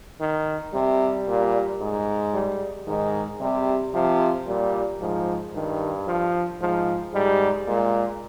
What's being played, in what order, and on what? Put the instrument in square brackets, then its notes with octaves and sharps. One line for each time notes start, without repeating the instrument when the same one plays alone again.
[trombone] D#3
[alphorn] C3 [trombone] G3
[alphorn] A#2
G#2
[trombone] G3
[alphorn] G#2 [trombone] D#3
[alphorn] C3 [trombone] G3
[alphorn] C3 [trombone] F3
[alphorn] A#2 [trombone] G3
[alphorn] G#2 [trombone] F3
[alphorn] G2 [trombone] D#3
[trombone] F3
[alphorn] G#2 [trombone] F3
[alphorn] G#2 [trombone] G3
[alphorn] A#2 [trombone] G#3